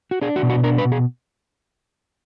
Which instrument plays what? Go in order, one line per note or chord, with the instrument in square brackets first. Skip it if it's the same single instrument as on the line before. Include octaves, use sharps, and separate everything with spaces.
[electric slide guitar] F#4
D4 G#4
F#4
B2
F#4
D4 A#4
B4
B2
G#4